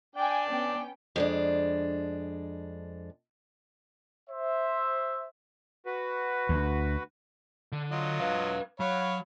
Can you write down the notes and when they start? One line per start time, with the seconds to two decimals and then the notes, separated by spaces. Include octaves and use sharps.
0.16 D4 G5 G#5
0.49 B3 C#4 G5
1.16 F2 G#3 D4
4.30 C5 E5
5.86 F#4 B4
6.49 D2
7.72 D3
7.91 F#3 F4 D#5
8.20 B4 F5
8.80 F#3 C#5 F5 B5